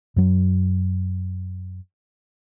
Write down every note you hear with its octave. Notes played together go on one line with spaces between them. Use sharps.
F#2 F#3